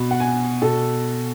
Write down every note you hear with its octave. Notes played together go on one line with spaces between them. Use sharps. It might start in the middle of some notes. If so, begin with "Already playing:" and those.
Already playing: B2 B5
F#5
G#5
B2 A4